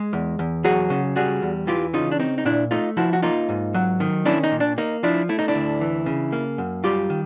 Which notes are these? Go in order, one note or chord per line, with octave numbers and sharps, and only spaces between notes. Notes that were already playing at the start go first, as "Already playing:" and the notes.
Already playing: G#3 G#4
E2
E2
F#3 F#4 G#4
C#3
G3 F#4 G#4
E2
E3 F4 G4
C#3 D#4 F4
D4
C4 D#4
D#4
A#2 D4 E4
A3 D#4 F4
F3 E4 F#4
F#4
A#3 D#4 F4
G#2
F#3
D#3
C#4 D4 E4
D#4
A#2
D4
A#3 D#4
F3 D4 E4
A3 E4
D#4
D4 E4
D2
E3
C#3
A#3
F#2
G3 F4 G4
D#3